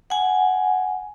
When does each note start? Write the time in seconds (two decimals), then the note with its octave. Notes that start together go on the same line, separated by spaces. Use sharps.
0.10 F#5 G#5